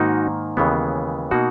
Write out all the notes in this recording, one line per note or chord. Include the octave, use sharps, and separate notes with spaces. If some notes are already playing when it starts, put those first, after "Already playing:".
Already playing: G#2 D#3 A#3 D#4 F#4
D#2 C#3 E3 G#3 B3
B2 A#3 D#4 F#4